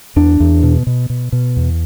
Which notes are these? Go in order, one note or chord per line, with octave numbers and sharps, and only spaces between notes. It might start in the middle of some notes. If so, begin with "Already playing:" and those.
E2 D4
E2
B2
B2
B2
B2
E2